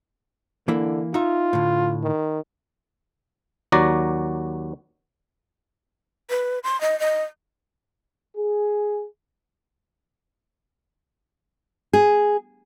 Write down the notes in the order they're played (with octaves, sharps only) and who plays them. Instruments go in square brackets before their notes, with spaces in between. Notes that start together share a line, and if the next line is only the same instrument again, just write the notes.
[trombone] D3 [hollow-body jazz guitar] E3 A#3 E4
[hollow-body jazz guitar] D#4 E5 [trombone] F4
[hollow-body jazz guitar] A2 D3
[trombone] D#3
[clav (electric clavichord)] D#2 F#3 F#4 D5 A#5
[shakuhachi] B4
C6
D#5
D#5
[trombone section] G#4
[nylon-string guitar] G#4